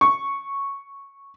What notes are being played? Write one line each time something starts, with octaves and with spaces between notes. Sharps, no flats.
C#6